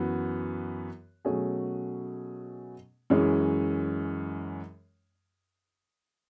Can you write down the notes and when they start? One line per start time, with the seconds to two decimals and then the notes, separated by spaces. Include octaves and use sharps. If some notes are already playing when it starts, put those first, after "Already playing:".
Already playing: F#2 E3 B3 F#4
1.25 B2 F#3 A3 C#4 G#4
3.10 F#2 E3 G#3 C#4 G#4